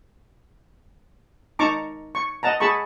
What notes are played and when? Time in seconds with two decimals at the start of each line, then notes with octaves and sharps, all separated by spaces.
1.59 D#4 A5 A#5 C#6 D6
2.15 C#6
2.43 D#5 F#5 A5 A#5
2.60 G#4 A5 B5 C#6